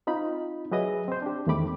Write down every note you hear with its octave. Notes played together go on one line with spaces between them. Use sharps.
C4 D#4 F4 B5
F#3 G#4 B4 D#5 E5 D#6
C4 C5
D4 G4
E2 D#3 A3 C4 B5 D6